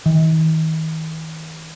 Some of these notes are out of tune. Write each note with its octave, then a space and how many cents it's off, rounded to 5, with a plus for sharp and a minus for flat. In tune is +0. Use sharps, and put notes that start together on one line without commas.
D#3 +45